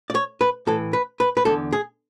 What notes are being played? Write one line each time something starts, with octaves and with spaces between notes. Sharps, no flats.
D5
C#5
B4
A2 E3 A4
B4
B4
B4
E2 D3 A4
G#4